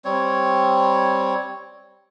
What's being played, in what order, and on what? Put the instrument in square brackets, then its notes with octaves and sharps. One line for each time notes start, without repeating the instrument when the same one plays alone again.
[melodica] G3 C4 C#5